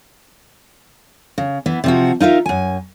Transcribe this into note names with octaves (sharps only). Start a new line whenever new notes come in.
C#3
E3 B3
C3 F3 F#4
D#4 F4 A#4 E5
F#2 G#5